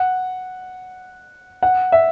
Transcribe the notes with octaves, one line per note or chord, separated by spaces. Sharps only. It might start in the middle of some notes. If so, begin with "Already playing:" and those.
Already playing: F#5
F#5
E5